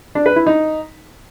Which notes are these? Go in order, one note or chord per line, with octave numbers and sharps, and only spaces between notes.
D4
B4
E4
D#4